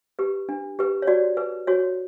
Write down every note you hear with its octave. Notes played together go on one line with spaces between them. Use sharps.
G4 B4
D4
G4 B4
C#5
F#4 D5
B4
F#4 C#5